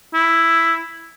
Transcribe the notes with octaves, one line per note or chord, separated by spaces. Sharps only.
E4